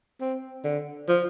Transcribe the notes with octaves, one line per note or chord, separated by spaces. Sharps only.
C4
D3
F3